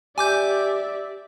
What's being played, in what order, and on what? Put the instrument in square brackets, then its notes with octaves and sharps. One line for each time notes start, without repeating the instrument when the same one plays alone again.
[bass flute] G4 [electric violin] D5 E5 [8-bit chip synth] G#5 D6 G6